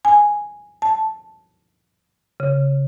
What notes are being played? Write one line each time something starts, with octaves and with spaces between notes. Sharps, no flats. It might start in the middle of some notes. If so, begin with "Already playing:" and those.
G#5
A5
C#3